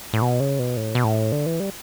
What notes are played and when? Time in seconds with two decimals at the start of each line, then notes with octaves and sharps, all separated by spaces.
0.13 A2
0.22 B2
0.40 C#3
0.59 B2
0.77 A2
0.95 B2
1.04 A2
1.32 D3
1.46 E3
1.60 G3